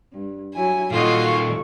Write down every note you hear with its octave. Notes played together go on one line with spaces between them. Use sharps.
G2
F#3 E4 G#5
A#2 D#3 D#4 F4 F#4 A4 D#5 F5
C#6